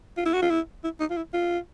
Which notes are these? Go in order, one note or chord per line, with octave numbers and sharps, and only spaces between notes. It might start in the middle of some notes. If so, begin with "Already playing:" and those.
F4
E4
F#4
F4
E4
E4
D#4
F4
E4
F4